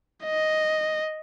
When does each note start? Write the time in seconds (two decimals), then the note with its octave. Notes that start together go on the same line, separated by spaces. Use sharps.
0.25 D#5